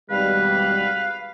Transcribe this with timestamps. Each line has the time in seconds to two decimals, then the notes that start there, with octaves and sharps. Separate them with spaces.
0.10 G#1 B2 G3 B4 F5